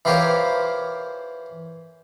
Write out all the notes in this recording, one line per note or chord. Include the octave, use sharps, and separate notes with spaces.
E3 F4 G4 A#4 C5 C#5